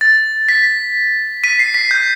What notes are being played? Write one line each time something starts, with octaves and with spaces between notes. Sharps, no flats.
A6
B6
B6 D#7
C7
B6
G6